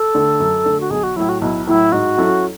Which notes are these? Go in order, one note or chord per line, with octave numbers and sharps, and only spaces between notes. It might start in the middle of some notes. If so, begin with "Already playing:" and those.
Already playing: A4
D3 A3
F#2
D3 A3
F#4
B1 G#4
F#4
A2 F#3 E4
F#4
B1 E4
A2 F#3 E4
G#2 F#4
F#3 C#4 E4 A4